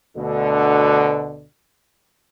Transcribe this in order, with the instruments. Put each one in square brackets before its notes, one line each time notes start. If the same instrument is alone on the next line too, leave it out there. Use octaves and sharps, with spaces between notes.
[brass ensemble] D2 B2 D3